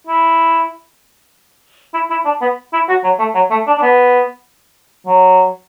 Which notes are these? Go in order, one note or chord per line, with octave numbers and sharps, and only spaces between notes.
E4
E4
E4
D4
B3
E4
F#4
F#3
A3
F#3
A3
D4
D4
B3
F#3